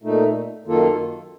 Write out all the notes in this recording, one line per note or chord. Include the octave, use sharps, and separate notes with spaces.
A#2 A3 D#4
F#2 D#3 A#3 F4 A4